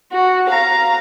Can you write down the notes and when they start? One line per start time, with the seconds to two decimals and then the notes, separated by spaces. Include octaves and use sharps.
0.12 F#4
0.50 F5 A#5